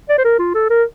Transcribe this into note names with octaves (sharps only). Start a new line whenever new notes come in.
D5
C5
A#4
F4
A4
A#4